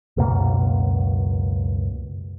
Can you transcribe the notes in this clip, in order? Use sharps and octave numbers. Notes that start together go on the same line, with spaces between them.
C#2 F#2 B2 A#3